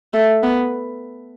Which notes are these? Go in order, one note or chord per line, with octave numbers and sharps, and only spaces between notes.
A3
B3